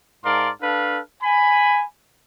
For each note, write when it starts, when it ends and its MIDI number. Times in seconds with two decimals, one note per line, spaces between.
0.25 0.50 44
0.25 0.50 70
0.25 0.50 74
0.25 0.50 77
0.25 0.50 81
0.25 0.50 84
0.61 0.99 62
0.61 0.99 69
0.61 0.99 71
0.61 0.99 77
1.22 1.84 80
1.22 1.84 83